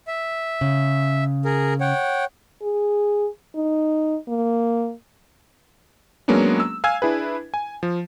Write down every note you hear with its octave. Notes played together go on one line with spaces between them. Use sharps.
E5
C#3
G#4 A#4
C#5 F#5 G5
G#4
D#4
A#3
F#3 G#3 A#3 B3 C#4 D4
E6
F5 G#5 E6 G#6
D4 E4 G#4 B4
G#5
F3